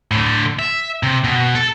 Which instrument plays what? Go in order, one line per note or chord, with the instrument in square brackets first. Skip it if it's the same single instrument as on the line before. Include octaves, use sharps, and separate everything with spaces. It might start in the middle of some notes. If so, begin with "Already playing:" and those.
[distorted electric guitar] A2 D3
E5
C3
B2
A4